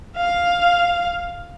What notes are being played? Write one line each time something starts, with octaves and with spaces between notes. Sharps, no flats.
F5